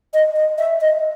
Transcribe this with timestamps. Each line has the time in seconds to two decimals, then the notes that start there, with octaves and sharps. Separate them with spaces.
0.14 D#5
0.36 D#5
0.58 E5
0.81 D#5